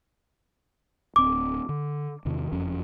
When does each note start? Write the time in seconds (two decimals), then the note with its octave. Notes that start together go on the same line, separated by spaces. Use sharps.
1.16 D1 C4 D6
1.69 D3
2.25 E2 C3 D#3
2.52 F#1 F2 C#4